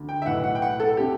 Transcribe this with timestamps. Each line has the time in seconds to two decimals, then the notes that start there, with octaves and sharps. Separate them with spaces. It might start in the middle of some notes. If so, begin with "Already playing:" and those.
Already playing: D2 D3
0.09 G5
0.22 E5
0.26 B1 A2 E3 F#5
0.44 F#5
0.55 G5
0.62 F#5
0.80 A4
0.97 C3 G4